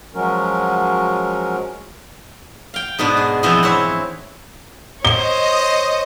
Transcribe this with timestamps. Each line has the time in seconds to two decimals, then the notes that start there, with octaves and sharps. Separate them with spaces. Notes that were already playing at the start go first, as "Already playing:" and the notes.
0.15 F3 F#3 G#3 C#4 F#4 A#4
2.74 F5 G5
2.99 G#2 B2 B3 D4
3.17 G#4
3.43 B2 E3 F3 B3 C4
3.63 C4 E4 C#5
5.05 C5 C#5 D#5 G7